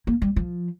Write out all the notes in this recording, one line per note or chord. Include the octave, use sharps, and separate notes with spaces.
A#3
G3
F3